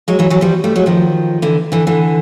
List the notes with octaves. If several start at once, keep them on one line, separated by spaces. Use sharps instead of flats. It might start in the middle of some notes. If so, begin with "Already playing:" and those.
F#3 G#3
E3 F#3
E3 F#3
F3 G3
G3 A3
F#3 G#3
D#3 F3
D3 E3
D3 E3
D3 E3